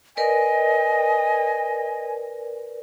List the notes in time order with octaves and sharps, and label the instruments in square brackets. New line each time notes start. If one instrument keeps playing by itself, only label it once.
[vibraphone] A#4 B4 D5 [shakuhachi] D#5 [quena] G#5